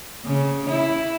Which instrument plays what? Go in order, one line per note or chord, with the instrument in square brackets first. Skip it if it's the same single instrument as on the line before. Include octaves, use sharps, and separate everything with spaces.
[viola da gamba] C#3
E4